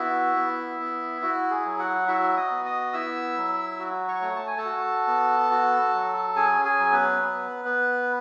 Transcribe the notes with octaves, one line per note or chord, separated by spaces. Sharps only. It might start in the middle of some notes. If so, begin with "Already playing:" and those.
Already playing: B3 E4 F#4 E5
B3
B3
E4 F#4
G#4
F#3
F#4 F#5
E4 F#4 E5
D#5 D#6
B3
D#5 D#6
E4 E5 E6
F#3
F#4
C#5 C#6
A3
A5
G#5
A4 A5
F#4
B3
F#4
F#3
C#4 G#4 G#5
G#4 G#5
F#3
B3 B4
B3
B3